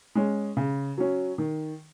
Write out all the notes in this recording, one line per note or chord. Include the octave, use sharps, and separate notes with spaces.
G#3 C#4
C#3
F#3 C#4
D#3